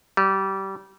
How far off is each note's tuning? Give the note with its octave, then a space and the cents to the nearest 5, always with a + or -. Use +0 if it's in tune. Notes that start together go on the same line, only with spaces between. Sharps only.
G3 -25